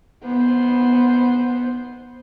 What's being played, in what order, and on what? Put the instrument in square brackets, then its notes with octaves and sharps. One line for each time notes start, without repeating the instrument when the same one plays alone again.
[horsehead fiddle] B3 C5